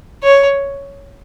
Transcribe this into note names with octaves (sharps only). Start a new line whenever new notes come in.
C#5